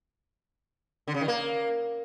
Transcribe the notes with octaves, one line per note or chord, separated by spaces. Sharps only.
D3
C#3
D#3
A#3